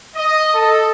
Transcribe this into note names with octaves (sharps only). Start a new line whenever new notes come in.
D#5
A4